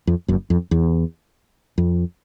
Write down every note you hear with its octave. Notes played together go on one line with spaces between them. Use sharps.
F2
F#1 F#2
F2
E2
F2